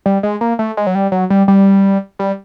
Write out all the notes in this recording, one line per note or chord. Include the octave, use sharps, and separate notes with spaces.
G3
G#3
A#3
A3
G#3
F#3
G3
F#3
G3
G3
G3